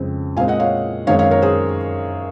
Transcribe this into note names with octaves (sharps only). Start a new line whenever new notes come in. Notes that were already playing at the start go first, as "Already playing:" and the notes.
Already playing: F2 C#3 G#3 C4
A#2 G#3 C4 F5 G#5
D#5 F#5
C#5 F5
F#2 D#3 G#3 C4 C#5 F5
C#5 F5
A#4 C#5
G#4 C5